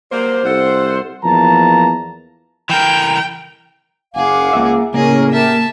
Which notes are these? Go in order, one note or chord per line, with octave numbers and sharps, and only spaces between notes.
F#3 G3 A#3 C5
C2 F4 A4 F#5
E2 F3 A#3 A5 A#5
E3 A#4 G5
F#1 G#4 F5 F#5 D6
C#2 A#3 E5
A2 C#3 A#3 C#4 G#4 A#4 D#5
G4 A#4 E5 A5